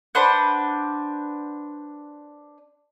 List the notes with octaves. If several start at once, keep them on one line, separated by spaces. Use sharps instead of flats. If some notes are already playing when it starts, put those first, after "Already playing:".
D4 B4 C5 F#5